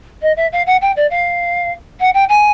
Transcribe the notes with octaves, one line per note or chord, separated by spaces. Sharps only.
D#5
E5
F5
F#5
G5
D5
F5
F#5
G5
G#5